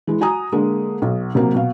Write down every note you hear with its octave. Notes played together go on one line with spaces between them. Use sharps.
E3 G#3
F#4 G#5 A#5 D#6
D3 G#3 A#3
B1
C3 F#3 A#3
B2 F5